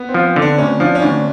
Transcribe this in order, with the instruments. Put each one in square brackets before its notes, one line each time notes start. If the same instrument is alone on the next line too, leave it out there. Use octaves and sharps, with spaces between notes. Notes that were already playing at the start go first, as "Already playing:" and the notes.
Already playing: [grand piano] B3
C4
[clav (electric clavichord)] F3
[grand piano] C4
[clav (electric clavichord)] D3
[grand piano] D4
[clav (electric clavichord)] D2 [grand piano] C#4
[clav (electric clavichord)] F3 [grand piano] D4
[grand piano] C#4
[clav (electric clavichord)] D2 [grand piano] D4